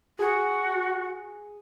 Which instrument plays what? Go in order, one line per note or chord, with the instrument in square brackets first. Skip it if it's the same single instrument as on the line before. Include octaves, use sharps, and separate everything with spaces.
[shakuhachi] F#4 [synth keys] G#4 G#5